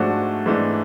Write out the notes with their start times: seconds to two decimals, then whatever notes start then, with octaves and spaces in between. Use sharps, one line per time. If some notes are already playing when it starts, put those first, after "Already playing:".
Already playing: G#2 F3 A3 D4 F#4
0.46 G#2 E3 A3 D4